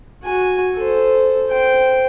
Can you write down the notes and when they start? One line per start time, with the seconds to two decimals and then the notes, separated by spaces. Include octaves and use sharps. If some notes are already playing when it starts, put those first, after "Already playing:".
0.24 F#4 G#5
0.77 A4 C5
1.49 C5 G5